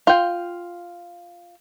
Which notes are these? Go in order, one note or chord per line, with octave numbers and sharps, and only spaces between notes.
F4 G5